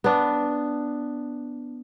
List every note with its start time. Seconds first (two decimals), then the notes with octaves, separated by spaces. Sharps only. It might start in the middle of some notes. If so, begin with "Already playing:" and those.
0.04 B3 D4